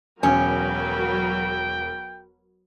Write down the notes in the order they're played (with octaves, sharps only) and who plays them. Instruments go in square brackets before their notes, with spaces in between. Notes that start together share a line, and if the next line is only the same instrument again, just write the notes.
[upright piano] E1 [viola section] F#3 A#4 B4 [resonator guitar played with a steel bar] C#4 [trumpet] G5